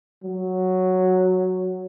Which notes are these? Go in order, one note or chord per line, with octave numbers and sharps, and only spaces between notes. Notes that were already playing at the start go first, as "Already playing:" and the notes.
F#3